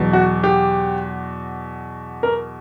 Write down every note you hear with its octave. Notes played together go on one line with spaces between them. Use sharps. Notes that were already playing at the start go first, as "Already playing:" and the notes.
Already playing: E2 B2 F#3
F#4
G4
A#4